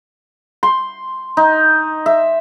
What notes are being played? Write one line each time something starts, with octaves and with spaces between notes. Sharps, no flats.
C6
D#4
E5